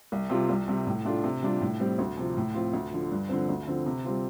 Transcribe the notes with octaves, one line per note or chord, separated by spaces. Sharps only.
C2
C3 G3 F4
C2
C3 G3
A2
A3 D4 F4
C3
G3 D4 F4
A2
G3 C4
D2
C3 F3
A2
F3 C4 F4
D2
D3 F3
G2
D3 F3 C4
D2
D3 F3 C4
C3
G3 C4 F4